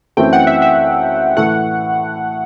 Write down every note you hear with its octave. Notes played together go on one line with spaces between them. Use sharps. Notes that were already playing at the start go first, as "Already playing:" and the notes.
F#2 E3 A3 C4 E4 G5
F#5
E5
E5
A2 E3 A3 F#5